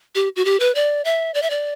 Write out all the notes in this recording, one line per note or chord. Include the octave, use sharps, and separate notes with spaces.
G4
F#4
G4
B4
D5
E5
D5
E5
D5